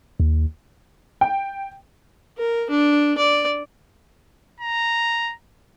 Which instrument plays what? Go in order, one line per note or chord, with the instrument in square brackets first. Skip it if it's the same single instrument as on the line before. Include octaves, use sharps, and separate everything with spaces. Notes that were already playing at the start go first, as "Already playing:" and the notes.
[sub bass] D#2
[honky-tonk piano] G5
[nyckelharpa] A#4
D4
D5
[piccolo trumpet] A#5